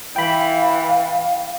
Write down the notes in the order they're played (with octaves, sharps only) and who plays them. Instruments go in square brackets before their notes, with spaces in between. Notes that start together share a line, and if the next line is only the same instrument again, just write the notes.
[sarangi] E3 [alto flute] F5 [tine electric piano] G5 B5